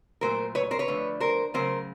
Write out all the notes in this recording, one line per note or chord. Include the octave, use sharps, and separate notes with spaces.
A#2 F#3 A3 A#4 C5
B4 C#5
A#4 C5
B4 C#5
D3 F3 A3
A#4 C5
C#3 F#3 A3 A#4 C5